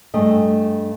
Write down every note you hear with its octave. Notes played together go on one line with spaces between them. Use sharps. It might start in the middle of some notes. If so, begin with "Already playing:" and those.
G2 A3 G#4 D#5